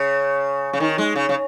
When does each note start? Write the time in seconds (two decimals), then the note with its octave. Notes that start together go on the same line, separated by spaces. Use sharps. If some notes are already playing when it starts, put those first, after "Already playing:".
Already playing: C#3
0.73 C#3
0.80 D#3
0.98 G#3
1.16 C#3
1.29 C#3